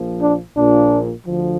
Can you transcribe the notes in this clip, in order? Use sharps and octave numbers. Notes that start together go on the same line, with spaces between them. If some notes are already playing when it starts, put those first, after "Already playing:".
Already playing: A#1 A#2 F3
D4
A#1 A#2 F3 D4
D2 D3 F3